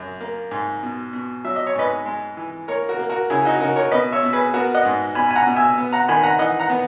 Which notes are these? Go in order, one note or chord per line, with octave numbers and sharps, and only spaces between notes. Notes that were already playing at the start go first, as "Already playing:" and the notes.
Already playing: F#2
A#3
G#2
B2
B2
F#3 E5
D#5
C#5
G#2 B4 D#5
G#3
E3
A#3 A#4 C#5
F#4 A#4
A#3
F#4 A#4
C#3 E4 G#4
D#4 F#4
C#3 F#4 A#4
A#4 C#5
B2 B4 D#5
C#5 E5
B2
G#4 B4
B3 F#4 A#4
D#5 F#5
G#2
B2 G#5 B5
G#5
F#5 A#5
B2
E5 G#5
B3
F#5 A#5
D#3 G#5 B5
F#5 A#5
E3 D#5 F#5
F#5 A#5
B3